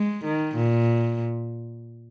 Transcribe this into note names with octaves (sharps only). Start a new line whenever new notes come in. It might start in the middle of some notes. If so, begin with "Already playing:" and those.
Already playing: G#3
D#3
A#2